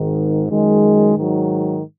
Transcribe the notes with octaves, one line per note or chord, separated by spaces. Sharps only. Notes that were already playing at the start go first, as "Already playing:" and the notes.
Already playing: G#1 G#2 D#3
F#2 D#3 G#3
G#2 D#3 F#3